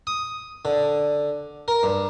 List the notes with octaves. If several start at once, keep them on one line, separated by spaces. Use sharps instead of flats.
D#6
D3
A#4
G2